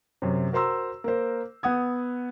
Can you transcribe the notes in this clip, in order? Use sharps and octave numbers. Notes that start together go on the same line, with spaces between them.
F#2 C3
F#4 A#4 C5 A#5 C6 E6
A#3 A#4 C5
B3 F#5 D#6 G#6